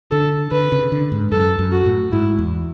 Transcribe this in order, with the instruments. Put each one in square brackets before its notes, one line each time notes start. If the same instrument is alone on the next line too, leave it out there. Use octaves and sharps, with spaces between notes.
[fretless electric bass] D3 [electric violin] A4
[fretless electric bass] D3 [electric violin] B4
[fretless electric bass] C#3
D3
G#2
[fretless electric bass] F#2 [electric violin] A4
[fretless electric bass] F#2
[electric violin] F#4
[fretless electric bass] A2
[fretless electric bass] G#2 [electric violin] E4
[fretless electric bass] E2